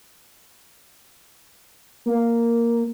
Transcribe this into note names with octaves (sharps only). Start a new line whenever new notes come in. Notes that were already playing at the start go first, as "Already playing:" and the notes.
A#3